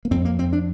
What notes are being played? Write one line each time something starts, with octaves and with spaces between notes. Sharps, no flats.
A#3
F2 C4
A#3
F2 C4
D4